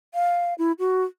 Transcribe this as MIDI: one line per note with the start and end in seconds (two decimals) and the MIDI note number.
0.14 0.54 77
0.58 0.72 64
0.79 1.04 66